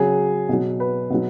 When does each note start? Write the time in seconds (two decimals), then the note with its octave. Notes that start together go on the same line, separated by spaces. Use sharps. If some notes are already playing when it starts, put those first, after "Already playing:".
Already playing: C#3 F#3 G#4
0.49 B2 F#3
0.80 B4
1.10 B2 F#3